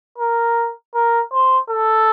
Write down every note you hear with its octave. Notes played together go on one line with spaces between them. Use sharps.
A#4
A#4
C5
A4